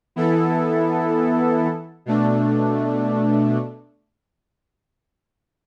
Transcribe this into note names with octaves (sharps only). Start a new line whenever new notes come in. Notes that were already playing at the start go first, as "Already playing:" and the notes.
E3 B3 E4 A4
B2 A3 D4